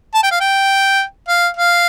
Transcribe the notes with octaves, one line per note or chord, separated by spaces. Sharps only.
A5
G5
F5
G5
F5
F5